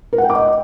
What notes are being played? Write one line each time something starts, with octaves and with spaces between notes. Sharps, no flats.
A#4
F#5
G5
D6
D#5